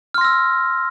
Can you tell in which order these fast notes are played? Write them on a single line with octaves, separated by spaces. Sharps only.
F6 C6 A#6 E6